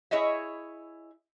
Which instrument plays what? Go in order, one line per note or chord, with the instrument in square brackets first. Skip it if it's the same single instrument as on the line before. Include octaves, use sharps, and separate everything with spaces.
[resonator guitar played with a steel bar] E4 G#4 C#5 D#5 E5